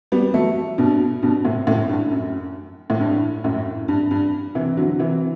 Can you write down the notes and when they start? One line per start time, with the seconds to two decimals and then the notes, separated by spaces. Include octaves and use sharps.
0.12 G3 B3
0.34 F#3 A3
0.78 G2 B2
1.23 G2 B2
1.45 A2 C3
1.67 F#2 A2
1.89 G2
2.11 F#2
2.90 A2
3.00 G2
3.44 F#2 A2
3.88 G2
4.11 G2
4.55 C3 E3
4.77 D3 F#3
4.99 C3 E3